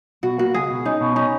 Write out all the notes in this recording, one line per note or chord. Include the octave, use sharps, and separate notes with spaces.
B2 F#4
A#3 F#4
C#2 G#4
B2
C#4 D#4
B2
C#4 D#4